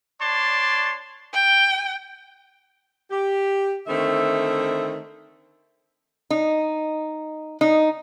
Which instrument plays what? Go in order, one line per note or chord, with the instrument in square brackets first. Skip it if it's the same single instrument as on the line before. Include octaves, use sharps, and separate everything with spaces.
[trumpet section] D4 C#5 D5 A5 C6
[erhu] G5
[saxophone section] G4
D3 D#3 A3 C4 E5
[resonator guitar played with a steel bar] D#4
D#4